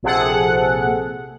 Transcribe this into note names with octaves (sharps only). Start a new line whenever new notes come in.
A#1 C3 G#4 A4 F#5